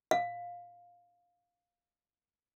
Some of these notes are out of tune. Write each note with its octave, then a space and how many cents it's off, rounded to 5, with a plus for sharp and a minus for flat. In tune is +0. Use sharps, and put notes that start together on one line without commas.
F5 +10